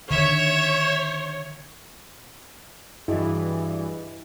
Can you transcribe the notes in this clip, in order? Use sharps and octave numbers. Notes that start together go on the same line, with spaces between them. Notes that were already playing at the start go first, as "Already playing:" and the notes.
D3 D#3 C#5 E5
G2 E3 E4 F#4 G#4 D#5